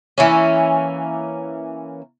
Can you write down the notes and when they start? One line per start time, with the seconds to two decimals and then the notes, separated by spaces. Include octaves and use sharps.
0.18 E3 A#3 C#4